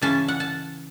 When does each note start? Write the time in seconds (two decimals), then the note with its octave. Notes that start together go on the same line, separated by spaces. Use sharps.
0.02 C#3 E3 C#4 A5
0.28 F#5
0.40 A5